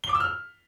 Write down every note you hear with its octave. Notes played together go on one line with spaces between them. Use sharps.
G7
D6
E6
F6